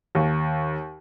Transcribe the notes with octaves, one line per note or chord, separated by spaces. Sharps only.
D#2